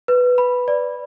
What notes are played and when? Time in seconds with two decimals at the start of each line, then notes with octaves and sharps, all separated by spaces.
0.08 B4
0.38 B5
0.68 D5